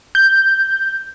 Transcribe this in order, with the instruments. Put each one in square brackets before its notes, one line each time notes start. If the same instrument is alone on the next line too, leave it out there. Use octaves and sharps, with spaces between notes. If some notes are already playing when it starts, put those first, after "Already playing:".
[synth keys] G6